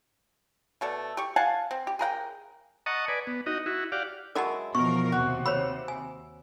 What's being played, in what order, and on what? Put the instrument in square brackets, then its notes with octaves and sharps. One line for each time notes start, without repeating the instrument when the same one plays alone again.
[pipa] B2 A3 A4 D5
G4 C#6
F5 F#5 G#5 A5
C4
G4
G#4 A#4 F#5 G5
[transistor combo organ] D#5 F#5 A5 A#5 C#6 D#6
B4 D5 G#5
B3
D#4 F#4 D#5
E4 F#4
G4 D5 F5 F#5
[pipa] F#3 G#3 E4 [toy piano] A#4 D#5 A5
[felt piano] B2 [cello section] E3 F3 A#4 [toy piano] C#6
[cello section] D#2 C3 [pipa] F#4
[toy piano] C5 C#5 B5 [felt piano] E6
[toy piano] G#5